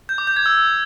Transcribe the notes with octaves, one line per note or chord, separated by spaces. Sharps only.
G6
D6
G6
G#6
E6